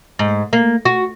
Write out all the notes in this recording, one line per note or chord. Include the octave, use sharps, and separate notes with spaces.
G#2
A#3
F#4